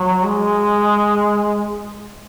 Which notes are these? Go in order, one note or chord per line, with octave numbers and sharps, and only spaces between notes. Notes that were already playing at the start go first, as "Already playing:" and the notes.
Already playing: F#3
G#3